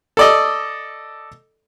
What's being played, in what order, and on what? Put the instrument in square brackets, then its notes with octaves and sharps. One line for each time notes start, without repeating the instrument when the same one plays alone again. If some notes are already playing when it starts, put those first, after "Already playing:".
[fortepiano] A4 D5 D#5